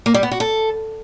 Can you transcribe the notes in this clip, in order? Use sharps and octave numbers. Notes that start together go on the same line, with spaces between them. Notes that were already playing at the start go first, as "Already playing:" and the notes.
A#3
G3
B3
F#4
A4